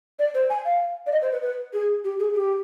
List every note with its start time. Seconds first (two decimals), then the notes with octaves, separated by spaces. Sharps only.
0.19 D5
0.34 C5
0.50 G#5
0.66 F5
1.07 D5
1.12 D#5
1.22 C5
1.32 B4
1.42 B4
1.73 G#4
2.04 G4
2.19 G#4
2.34 G4